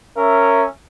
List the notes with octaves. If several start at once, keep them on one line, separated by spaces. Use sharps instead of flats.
C#4 A#4 E5